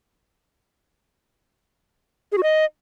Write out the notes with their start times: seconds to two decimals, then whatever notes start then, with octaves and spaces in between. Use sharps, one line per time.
2.32 G#4
2.38 F#4
2.43 D#5